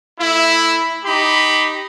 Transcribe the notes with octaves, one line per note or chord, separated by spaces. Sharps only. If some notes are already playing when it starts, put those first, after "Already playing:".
A3 E4
D#4 G4 B5